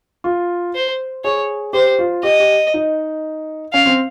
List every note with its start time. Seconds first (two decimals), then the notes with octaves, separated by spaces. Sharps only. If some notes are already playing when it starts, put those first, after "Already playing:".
0.24 F4
0.75 C5
1.24 G#4 C#5
1.73 G4 C5
1.99 F4
2.23 G4 D#5
2.40 G4
2.74 D#4
3.73 C#4 F5
3.86 C4